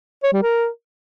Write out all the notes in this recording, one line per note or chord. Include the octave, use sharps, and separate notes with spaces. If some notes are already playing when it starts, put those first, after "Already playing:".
C#5
G3
A#4